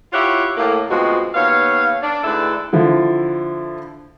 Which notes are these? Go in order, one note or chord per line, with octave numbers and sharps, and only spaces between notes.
E4 F4 G4 C#5 E5 F#5
A2 A#3
D2 B2 F3 G#3 C4 F#4
D#2 B3 C#5 F5
D4
D2 G#2 E4 A4 B4 D5
D3 F3 E4